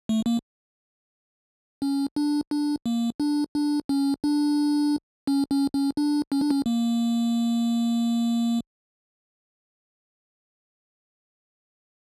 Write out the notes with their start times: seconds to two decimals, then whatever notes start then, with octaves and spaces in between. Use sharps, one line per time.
0.09 A3
0.26 A#3
1.82 C#4
2.16 D4
2.51 D4
2.86 A#3
3.20 D4
3.55 D4
3.89 C#4
4.24 D4
5.27 C#4
5.51 C#4
5.74 C#4
5.97 D4
6.32 C#4
6.41 D4
6.50 C#4
6.66 A#3